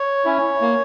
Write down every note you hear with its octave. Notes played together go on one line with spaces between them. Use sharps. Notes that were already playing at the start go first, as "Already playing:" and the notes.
Already playing: C#5
C#4 E4
A#3